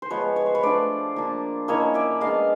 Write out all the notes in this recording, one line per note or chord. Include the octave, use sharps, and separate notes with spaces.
C5
F3 G#3 B3 B4 C#5
C#5
C5
B4 C#5
A3 D4 F4 C5 D5
F3 A#3 D4
F3 A#3 C#4 E4 C#5 D#5
D5 E5
G#3 B3 D4 D#5 F5